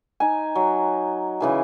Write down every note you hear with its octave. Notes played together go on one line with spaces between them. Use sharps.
D#4 G#5
F#3
C#3 E3 G#4